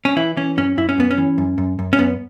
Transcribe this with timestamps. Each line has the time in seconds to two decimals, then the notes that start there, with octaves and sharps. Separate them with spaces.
0.05 C#4
0.17 E3 E4
0.37 E3 C#4
0.57 F#2 C#4
0.77 F#2 E4
0.89 C#4
0.98 F#2 B3
1.11 C#4
1.18 E3
1.38 F#2
1.58 F#2
1.79 F#2
1.93 C#4
1.98 F#2 B3